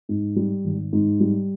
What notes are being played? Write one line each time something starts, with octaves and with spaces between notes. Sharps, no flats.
G#2
G3
G#1
G#2
G3